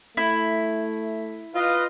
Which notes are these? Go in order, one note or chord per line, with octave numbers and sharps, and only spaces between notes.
A3 E4
F4 B4 D#5 F5